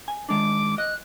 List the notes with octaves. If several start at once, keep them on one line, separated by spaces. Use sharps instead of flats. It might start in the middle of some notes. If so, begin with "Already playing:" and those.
G#5
D#3 G#3 D4 D6
D#5 F#6